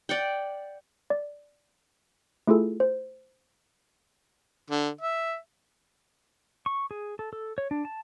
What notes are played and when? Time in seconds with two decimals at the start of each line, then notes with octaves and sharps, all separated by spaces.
0.09 D5 F#5 G5
1.10 D5
2.47 A3 E4 F4 G#4 A4
2.80 C5
4.70 D3
5.01 E5
6.66 C#6
6.91 G#4
7.19 A4
7.33 A4
7.58 C#5
7.71 D4
7.85 A5